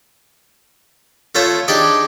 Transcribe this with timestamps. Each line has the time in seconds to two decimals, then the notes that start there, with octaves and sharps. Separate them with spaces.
1.35 A3 F4 C5 C#5 E5
1.68 D4 D#4 G4 G#4 D5 D#5